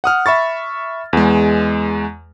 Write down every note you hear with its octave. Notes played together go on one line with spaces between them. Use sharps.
F#5 D#6 F6
E5 B5 C#6 A6
E2 G#3